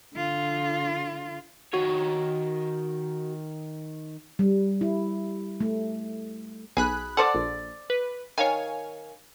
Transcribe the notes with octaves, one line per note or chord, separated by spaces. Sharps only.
D3 F4
D#3 F#4 C#5
G3
E4
A3
B1 G#4 B5 F#6
A4 C5 D5 F#5
A#1
B4
D#3 C#5 F5 G#5